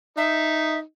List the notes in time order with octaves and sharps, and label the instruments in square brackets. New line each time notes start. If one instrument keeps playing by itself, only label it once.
[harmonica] D#4 [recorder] E5